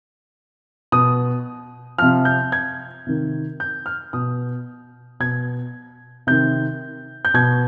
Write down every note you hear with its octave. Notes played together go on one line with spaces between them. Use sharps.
B2 D#6
C3 F3 F6
G6
G#6
C3 D#3
G6
F6
B2 D#6
B2 G#6
C3 D#3 G6
G6
B2 G#6